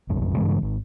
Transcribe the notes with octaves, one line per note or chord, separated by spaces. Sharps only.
F1 B1 F#2
G2 C#3 E3 G#3
G#1